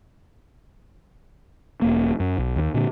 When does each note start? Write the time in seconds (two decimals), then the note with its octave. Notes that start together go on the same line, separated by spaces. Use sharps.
1.82 E1 A#3
2.20 F#2
2.38 B1
2.56 D#2
2.74 A#2 D3